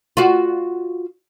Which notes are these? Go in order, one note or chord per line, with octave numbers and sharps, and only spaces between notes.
F4 F#4